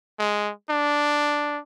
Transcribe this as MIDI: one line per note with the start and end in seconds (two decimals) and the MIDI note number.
0.19 0.52 56
0.70 1.59 62